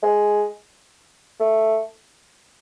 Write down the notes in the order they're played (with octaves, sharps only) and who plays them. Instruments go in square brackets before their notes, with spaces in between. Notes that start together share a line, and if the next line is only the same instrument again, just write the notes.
[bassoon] G#3
A3